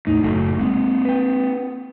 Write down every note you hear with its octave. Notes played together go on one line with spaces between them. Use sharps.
E2 A2 A3 D#4
F#1 F#3 A3
G#3 A#3 C4
B4 G5